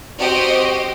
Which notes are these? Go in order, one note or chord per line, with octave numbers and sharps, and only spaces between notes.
C4 F#4 G4 C5 D#5